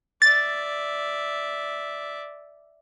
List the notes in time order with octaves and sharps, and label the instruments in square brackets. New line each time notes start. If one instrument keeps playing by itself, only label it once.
[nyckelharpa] D5 E5 [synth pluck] A6